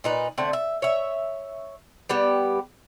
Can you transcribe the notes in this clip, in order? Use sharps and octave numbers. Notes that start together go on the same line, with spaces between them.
A#2 D#4 B4
D3 A3 C4
E5
C#5 E5
G3 B3 G4